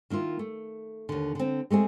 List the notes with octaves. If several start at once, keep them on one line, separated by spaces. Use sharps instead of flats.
D#3 A#3 E4 F4
A3
D#2 D3
D3 C4
G#3 A3 C4 G#4